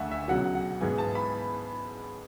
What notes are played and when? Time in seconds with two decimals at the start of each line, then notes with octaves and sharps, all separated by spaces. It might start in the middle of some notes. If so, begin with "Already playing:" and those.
Already playing: D2 D3 A3 E5 F#5 G#5
0.11 E5
0.28 C#2 B2 F#3 F#5
0.55 F#5
0.81 G#2 E3 G#3 B3 G#5
0.98 A5
1.15 B5